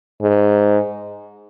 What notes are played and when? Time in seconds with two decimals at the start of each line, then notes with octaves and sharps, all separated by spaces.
0.22 G#2